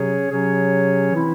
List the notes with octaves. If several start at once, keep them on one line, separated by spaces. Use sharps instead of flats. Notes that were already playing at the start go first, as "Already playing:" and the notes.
Already playing: C3 F#3 C#4 G#4 C#5
C3 F#3 C#4 G#4 C#5
E3 C4 E4